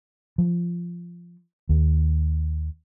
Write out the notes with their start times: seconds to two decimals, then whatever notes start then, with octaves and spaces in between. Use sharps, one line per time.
0.38 F3
1.69 D#2